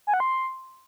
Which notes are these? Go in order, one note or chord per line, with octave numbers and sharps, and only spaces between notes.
G#5
F#5
C6